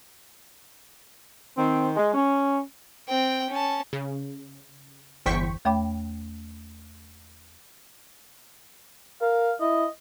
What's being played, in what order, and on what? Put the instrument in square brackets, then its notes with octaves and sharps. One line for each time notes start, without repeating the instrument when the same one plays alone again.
[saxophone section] D#3 C4
G#3
C#4
[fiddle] C4 G5
C#4 A5
[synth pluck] C#3
G1 E2 C5 G5 C#6 B6
[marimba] E2 A3 C#5 G5 B5 D6
[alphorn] A#4 [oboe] F5
[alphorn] E4 [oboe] D#5